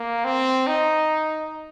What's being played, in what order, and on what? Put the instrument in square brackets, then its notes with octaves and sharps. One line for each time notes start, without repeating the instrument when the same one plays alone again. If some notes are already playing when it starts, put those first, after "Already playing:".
Already playing: [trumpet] A#3
C4
D#4